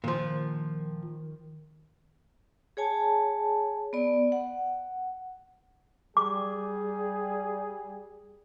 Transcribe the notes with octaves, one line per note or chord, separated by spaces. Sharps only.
A#2 D#3 F3
G#4 C#5 G#5 A5
B3 D5
F#5
G3 G#4 D6